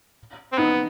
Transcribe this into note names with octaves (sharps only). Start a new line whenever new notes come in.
C4
B3 D#4